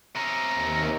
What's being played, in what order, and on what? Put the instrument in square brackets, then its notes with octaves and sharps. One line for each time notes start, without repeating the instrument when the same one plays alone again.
[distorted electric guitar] C3 C#4 [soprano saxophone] A#5
[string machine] D#2